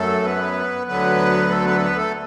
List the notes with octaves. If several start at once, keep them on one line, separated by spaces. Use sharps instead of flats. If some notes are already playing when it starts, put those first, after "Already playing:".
Already playing: F#2 F#3 A3 A4
B3 B4
D2 D3 F#3 B3 B4
A3 A4
B3 B4
A4
B3 B4
A3 A4